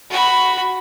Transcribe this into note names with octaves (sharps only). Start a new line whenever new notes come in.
F#4 B5